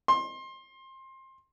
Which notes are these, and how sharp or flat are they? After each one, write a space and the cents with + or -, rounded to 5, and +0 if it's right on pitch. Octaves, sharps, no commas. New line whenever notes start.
C6 +25